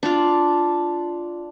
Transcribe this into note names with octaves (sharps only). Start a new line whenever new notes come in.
D4 F4